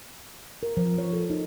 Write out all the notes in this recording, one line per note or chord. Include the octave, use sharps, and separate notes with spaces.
A#4
F3
C#5
A4
D#4